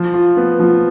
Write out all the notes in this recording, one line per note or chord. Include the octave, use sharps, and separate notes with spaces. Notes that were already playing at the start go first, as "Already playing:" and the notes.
Already playing: F3
F4
B3
F3